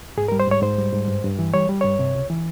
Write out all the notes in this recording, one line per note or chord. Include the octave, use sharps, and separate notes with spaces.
G#2 G#4
A#4
G3
C5
G#2 C#5
G#2 C5
G3
G#2
G2
G2
E3
G3 C#5
G3
G2 C#5
C3
C#2
E3